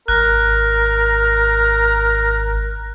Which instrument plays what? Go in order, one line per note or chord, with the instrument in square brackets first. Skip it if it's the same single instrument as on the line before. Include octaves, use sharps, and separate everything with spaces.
[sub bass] G#1 [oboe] A#4 [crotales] F#6